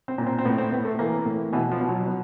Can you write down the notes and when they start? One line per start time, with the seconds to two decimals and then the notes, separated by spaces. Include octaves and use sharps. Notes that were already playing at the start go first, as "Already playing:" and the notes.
0.08 C4
0.18 A#2
0.27 C4
0.38 C4
0.45 A2 B3
0.58 C4
0.72 A2 B3
0.85 A3
0.99 E3 A#3
1.26 A2
1.53 B2 E3
1.71 F3
1.81 B2
1.89 F#3
2.07 B2